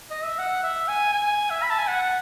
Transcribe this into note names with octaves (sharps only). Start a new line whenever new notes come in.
D#5
E5
F#5
E5
G#5
G#5
E5
B5
A5
G#5
F#5